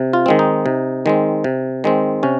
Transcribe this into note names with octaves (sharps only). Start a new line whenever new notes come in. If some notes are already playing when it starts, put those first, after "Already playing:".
Already playing: C3
F4
D#3 G#3 C4
D#4
C3
D#3 G#3 C4
C3
D#3 G#3 C4
C3 C#4